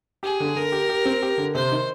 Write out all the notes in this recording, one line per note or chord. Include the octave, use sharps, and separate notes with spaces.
G4 G#4
D3
D3 A#4
G4
G4
C4
G4
D3
C3 C5
D#3